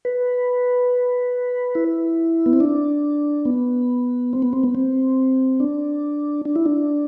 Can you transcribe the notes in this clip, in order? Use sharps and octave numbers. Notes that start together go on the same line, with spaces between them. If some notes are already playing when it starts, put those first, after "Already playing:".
B4
E4
B3
C4
D4
B3
C4
B3
C4
B3
C4
D4
D4
E4
D4